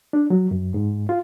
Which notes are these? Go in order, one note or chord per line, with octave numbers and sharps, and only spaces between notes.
D4
F#3
F#2
G#2
F4